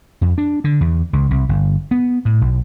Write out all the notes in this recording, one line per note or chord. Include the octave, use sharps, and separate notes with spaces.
F2
D4
D3
E2
C#2
C2
G1
B3
A2
B1